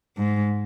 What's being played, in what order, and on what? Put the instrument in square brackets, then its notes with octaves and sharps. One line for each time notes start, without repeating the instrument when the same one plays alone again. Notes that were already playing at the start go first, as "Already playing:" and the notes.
[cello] G#2